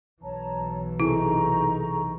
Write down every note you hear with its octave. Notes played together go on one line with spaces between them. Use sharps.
B1 E3 C#5 A5 A#5
C3 D#4 E4 G#4 A4 A#5 C#6